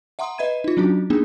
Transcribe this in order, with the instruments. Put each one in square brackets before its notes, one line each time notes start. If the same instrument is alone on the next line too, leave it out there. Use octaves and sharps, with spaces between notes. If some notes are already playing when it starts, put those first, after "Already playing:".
[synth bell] E5 F#5 A#5 C6 D#6
B4 D#5 E5 B5 G#6 D#7
D#4 F4
F#3 C#4 D4 F#4
A#3 B3 D4 D#4 G#4